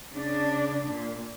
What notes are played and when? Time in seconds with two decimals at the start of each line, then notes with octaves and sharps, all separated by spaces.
0.12 C#3 D4
0.87 A#2